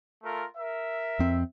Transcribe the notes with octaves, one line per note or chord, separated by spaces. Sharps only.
A3 F4 A#4
A#4 E5
F2 C4